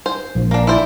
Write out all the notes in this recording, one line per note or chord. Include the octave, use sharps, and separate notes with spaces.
C5
A#1
A#3 D4
E4 C5 D5